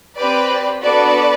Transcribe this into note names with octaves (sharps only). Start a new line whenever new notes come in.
C4 G4 B4 D5
B3 D4 F#4 A4 B4 D5